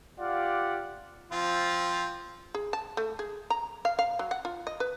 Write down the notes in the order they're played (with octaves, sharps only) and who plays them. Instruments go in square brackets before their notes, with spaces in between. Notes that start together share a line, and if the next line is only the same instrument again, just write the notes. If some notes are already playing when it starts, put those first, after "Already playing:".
[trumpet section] F4 G4 D5 F5 F#5
[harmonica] F3 C4 F4
[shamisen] G#4
A5
A3
G#4
A#5
F5
F5
F#3
F#5
F4
D#5
B4